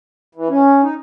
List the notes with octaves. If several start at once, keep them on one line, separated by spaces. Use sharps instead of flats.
E3
C#4
D#4